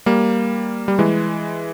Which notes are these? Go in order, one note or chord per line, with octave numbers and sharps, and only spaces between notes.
G3 A#3
G3
E3 G#3